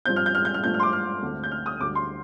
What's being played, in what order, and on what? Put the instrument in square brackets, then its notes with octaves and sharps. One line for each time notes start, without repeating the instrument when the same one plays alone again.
[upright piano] G2 F3 C4 G6
F6
G6
F6
G6
F6
G2 F3 A3 D4 G6
F6
C6
D6
F6
D2 D3 A3 C4
G6
F6
D#6
D2 D3 G3 D6
C6